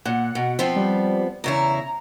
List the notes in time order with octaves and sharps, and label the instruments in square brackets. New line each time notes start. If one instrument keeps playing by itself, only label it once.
[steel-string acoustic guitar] A#2 [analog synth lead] F#5
[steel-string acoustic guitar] B2
F3 B3 C4
[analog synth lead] G3
[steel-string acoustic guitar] E2 C#3 E4 [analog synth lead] A#5